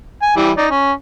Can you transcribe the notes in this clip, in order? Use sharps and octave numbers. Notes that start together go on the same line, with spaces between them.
G#5
E3 G3
D#4 D5
C#4